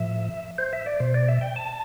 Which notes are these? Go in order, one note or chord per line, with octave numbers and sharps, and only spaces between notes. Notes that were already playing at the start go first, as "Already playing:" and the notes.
Already playing: A2 F3 E5
C5
E5
D5
B2 C5
D5
E5
G5
A5